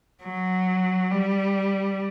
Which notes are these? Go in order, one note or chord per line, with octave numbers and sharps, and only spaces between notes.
F#3
G3